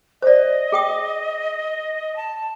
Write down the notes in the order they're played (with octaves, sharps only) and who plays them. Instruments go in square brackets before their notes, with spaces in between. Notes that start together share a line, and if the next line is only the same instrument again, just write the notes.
[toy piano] C5 D5 [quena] D#5
[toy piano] G#4 G5 D#6
[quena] A5